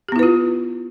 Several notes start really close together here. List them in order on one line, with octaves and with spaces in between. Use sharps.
G4 B3 E4 B4 F4